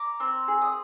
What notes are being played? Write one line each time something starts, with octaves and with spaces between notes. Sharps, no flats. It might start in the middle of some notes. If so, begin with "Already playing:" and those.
Already playing: A#5 D6
C4
G#4
D#6